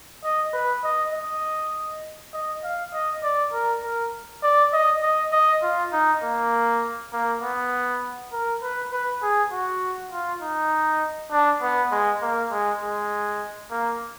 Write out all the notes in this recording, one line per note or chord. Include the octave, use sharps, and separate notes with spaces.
D#5
B4
D#5
D#5
D#5
F5
D#5
D5
A#4
A#4
D5
D#5
D#5
D#5
F4
D#4
A#3
A#3
B3
A#4
B4
B4
G#4
F#4
F4
D#4
D4
B3
G#3
A#3
G#3
G#3
A#3